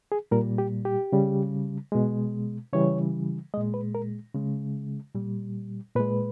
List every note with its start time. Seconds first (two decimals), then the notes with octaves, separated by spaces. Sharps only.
0.12 G#4
0.31 A#2 G3 A#4
0.58 G4
0.85 G4
1.13 C#3 G3
1.92 B2 G#3
2.73 C#3 E3 G3 C#5
3.54 G#3 D#5
3.57 A#2
3.74 B4
3.95 A#4
4.34 C#3 G#3
5.15 A#2 G3
5.96 A#2 G#3 B4